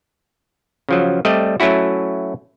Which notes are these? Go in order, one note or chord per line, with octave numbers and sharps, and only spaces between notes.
C#3 F3 F#3
G3 A3 C4 D5 D#5
F#3 A3 C#4 E4 F#4